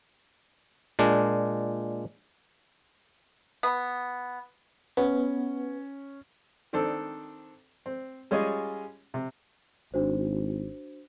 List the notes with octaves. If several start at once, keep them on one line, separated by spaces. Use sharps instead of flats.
A#2 G#3 D4
B3
B3 C#4
D#3 C4 D4 A4
C4
G3 G#3 C#4 F4 G#4 D#5
C3
G#1 D4 F#4 C5